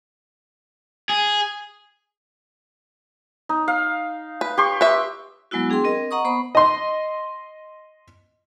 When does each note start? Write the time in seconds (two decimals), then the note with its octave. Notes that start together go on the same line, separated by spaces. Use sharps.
1.09 G#4
3.49 D#4
3.68 F5
4.41 B4
4.58 G4 C6 C#6
4.81 B4 E5
5.51 F#3 G#3 B3 E4 F#4
5.70 D4 G#4 G5 C6
5.84 C4 A#4 D#5
6.11 D#5 F#5 A#5 C#6 D#6
6.24 B3 C5 B5 C#6
6.55 D#5 C6